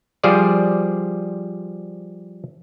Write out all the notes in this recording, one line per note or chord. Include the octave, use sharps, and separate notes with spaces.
F3 G3 G#4 C5 D5